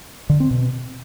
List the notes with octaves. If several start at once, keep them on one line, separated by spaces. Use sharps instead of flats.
D3
C4
B2